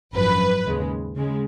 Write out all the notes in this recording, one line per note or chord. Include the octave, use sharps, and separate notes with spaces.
G#1 F#2 F3 B4
D#2 C#3 G#3
C#3 G#3